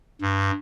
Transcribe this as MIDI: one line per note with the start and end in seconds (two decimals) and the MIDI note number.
0.21 0.51 43